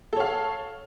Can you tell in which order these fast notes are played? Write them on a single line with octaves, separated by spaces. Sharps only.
A4 C#5 F5